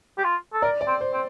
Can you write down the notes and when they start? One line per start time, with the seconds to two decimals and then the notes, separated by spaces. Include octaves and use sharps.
0.18 G4
0.24 F4
0.53 A4
0.62 A#4 D5
0.81 D5
0.87 C4
1.01 C5
1.13 C4